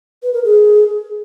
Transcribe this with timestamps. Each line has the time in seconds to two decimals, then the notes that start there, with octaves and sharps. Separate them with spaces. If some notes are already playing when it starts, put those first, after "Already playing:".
0.23 B4
0.34 A#4
0.44 G#4